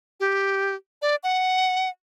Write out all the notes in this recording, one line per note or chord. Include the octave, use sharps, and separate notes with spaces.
G4
D5
F#5